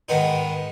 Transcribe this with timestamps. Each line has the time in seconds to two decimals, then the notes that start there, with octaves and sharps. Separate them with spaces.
0.09 G#2 D#3 B3 D#4